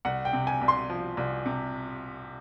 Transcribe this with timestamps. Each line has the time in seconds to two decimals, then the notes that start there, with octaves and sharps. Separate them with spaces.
0.05 C2 F#5
0.25 G5
0.33 C3
0.47 G#5
0.62 C2
0.68 C6
0.90 F3
1.17 C2
1.46 C3